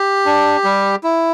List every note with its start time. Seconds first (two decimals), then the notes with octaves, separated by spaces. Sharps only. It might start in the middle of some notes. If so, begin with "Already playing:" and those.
Already playing: G4
0.26 D4
0.64 G3
1.04 E4